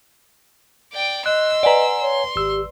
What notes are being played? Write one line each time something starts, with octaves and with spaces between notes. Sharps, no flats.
D5 G5
D#5 C6 E6 F#6
B4 D5 F#5 G#5 A#5
C#5 C6
G#1 G4 E6